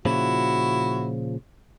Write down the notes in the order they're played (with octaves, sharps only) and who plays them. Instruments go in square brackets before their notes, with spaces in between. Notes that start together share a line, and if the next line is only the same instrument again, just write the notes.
[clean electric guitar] A#2 C#3 F3 [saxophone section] E4 F#4